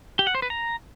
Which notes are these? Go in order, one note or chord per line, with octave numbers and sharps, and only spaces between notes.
G4
F#5
C5
B4
A#5